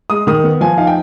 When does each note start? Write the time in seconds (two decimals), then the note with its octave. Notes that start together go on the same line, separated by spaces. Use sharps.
0.10 G#3 D#6
0.27 D#3 D#6
0.44 B3
0.61 F3 G#5
0.78 D#4 F5
0.87 G5